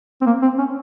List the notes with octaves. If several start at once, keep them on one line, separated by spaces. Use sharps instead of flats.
C4
A#3
C4
C#4